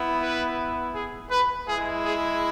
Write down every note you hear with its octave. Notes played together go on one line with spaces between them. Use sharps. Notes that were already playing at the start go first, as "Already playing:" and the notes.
Already playing: B3 E4
B4
G#4
B4
G#3 E4 G#4
G#4